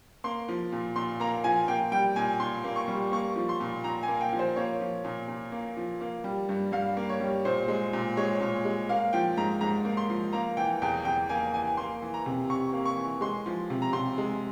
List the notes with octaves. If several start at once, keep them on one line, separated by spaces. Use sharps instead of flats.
A#3 C6
F3
A#2
A#2 C6
A#3 A#5
F3 G#5
A#3 G5
G3 G5
A#2 G#5
A#2 C6
A#3
C#6
G3
A#3 C#6
F3
C6
A#2
A#2 A#5
G#5
A#3
G5
F3
C5
A#3 C#5
F3
A#2
A#2
A#3
F3
A#3
G3
G2
G2 F5
A#3
C#5
G3
A#2 C5
G#3
A#2
G#3 C#5
A#2
G#3
A#3 F5
F3 G5
G#2 A#5
G#2 A#5
A#3
C6
F3
A#3 A#5
E3 G5
E2 G5
E2 G5
A#3 G#5
E3 G#5
A#3 C6
E3
A#5
C3
C3 C#6
A#3
C#6
E3
G#3 C6
F3
C3
A#5
C3 C6
G#3